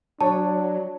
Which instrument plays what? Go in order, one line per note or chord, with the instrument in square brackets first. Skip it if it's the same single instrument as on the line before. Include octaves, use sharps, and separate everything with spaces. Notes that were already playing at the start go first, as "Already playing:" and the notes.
[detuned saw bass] F#3 [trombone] D4 [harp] C#5 [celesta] A5